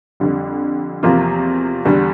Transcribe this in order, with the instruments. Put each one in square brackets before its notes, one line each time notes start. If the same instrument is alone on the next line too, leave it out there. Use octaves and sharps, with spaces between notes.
[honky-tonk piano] F2 D3 G3
E2 C3 F3 A#3 F4
E2 D3 G3